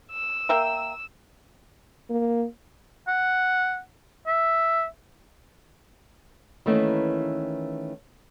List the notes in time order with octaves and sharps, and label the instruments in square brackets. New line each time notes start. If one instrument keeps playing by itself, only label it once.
[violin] E6
[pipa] A#3 E5 G5
[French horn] A#3
[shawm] F#5
E5
[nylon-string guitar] D#3 E3 A3 A#3 C#4 B4